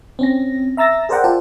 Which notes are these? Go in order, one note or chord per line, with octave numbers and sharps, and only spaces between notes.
C4 C#4 A#6
E5 A#5 E6 A6 A#6
G#4 A#4 C5 D5 F#5 G5
F4 C5 D5 A5